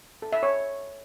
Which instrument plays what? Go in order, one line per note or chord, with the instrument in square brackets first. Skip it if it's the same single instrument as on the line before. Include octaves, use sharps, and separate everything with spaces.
[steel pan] A4
E5
C#5